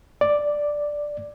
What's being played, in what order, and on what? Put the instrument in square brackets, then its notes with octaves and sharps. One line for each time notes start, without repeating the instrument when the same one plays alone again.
[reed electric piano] D5